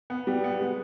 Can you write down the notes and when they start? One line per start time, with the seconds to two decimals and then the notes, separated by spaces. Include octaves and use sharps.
0.10 B3
0.27 G3
0.44 B3
0.61 G#3